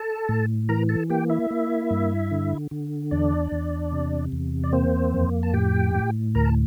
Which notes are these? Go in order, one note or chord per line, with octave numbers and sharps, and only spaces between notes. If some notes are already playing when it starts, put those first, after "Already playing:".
Already playing: A4 A5
A2
E3 A#4 A#5
A4 A5
A#3 G4 G5
E4 E5
A#3
G2
D3
D3
E2 D4 D5
E2
C3
E2
D5
A#3 C4 C5
F2
A5
A2 G4 G5
A2
D2 A#4 A#5
A5